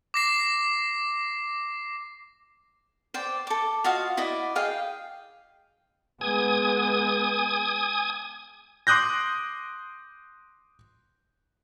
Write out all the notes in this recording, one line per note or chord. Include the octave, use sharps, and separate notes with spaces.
D6 A#6 C7
C5 D5 G5
A4 D6
F4 F#4 D#5 F5
E4 F#4 D5 D#5
G#4 D#5 F5 G5
G#3 B3 G#5 D#6
C6 D6 D#6 F#6 G6 A#6